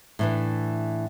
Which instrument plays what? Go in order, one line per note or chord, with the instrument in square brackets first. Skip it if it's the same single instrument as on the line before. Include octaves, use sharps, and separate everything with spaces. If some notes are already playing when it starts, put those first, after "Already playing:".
[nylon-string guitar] A2 E3 D4